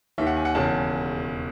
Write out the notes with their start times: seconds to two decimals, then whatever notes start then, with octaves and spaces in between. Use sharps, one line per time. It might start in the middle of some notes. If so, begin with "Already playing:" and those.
0.18 D#2 D#3 E5
0.27 F#5
0.36 G#5
0.45 F#5
0.55 E1 E2 C#3 A5